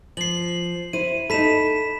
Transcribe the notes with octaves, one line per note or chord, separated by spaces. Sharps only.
F3 C7 F#7
E4 C5 D#7
D#4 A4 B5 B6 E7